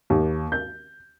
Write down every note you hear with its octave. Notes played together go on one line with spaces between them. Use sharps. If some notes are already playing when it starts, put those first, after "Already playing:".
D#2
G6